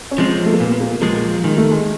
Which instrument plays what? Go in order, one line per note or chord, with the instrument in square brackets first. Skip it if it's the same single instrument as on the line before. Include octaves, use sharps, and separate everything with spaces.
[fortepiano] C#4
[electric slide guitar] F3 G#3 [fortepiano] C4
[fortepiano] A3
A#3
[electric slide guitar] A#2 [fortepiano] B3
[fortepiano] A#3
[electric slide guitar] F3 G#3 [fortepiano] A#3
[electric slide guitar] D#3 [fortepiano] G#3
[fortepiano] A3
G#3